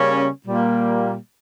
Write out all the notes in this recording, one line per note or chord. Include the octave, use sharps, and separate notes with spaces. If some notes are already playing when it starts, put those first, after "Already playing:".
Already playing: C#3 G3 A#3 C#4
A#2 G3 A#3